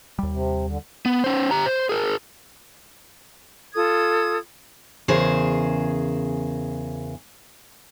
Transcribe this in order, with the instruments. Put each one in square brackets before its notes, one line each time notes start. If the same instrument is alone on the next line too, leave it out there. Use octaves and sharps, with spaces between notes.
[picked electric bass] D#2 G3
[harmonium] C3
D3
[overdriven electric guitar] B3
C#4 C5
G4 A#5
C5
G#4 A#4
[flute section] F4 A4 D#6 G#6
[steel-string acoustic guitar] E2 C#3 G#4 A#4 C5